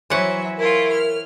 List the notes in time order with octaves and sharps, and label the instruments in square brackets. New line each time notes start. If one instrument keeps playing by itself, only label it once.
[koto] E3 F#5 [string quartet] F#3 E5 [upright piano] C5 C#5 C#6
[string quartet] E4 F4 [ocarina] A#4
[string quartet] F6